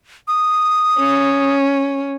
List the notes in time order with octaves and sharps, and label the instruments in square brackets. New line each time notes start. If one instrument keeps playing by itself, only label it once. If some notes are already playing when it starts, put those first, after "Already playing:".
[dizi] D#6
[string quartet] C#4